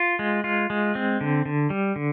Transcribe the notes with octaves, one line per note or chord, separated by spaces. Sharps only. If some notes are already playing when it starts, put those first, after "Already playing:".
Already playing: F4
G#3
F4
G#3
C4
D3
D3
G3
D3